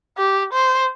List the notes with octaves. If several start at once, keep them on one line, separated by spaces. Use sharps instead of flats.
G4
C5